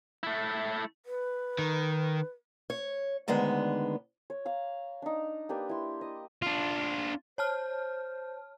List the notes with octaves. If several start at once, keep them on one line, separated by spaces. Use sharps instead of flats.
A3 E4
B4
D#3
C#5
D2 D3 D#3 G#3 B3
C#5
F5 A#5
D4 D#4
A#3 D4 G4 B4
E4 C6
D#5
D4 F4
C5 C#5 A5 F6